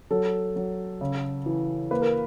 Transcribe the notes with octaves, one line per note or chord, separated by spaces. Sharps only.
F#3 A4
F#3
C#3
E3
A#3 B4
A#4